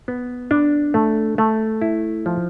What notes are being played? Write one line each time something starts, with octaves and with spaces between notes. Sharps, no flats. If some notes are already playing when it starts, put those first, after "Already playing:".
B3
D4
A3
A3
E4
F3